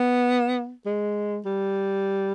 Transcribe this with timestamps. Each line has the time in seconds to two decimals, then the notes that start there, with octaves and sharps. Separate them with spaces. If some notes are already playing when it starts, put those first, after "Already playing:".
Already playing: B3
0.85 G#3
1.45 G3